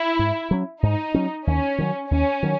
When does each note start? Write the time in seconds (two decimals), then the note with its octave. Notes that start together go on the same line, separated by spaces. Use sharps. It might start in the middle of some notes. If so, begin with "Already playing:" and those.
Already playing: E4
0.19 G#2
0.51 F#3 C#4
0.82 G#2 D#4
1.14 F#3 C#4
1.47 D#2 C#4
1.78 D#3 F#3
2.10 D#2 C#4
2.43 D#3 F#3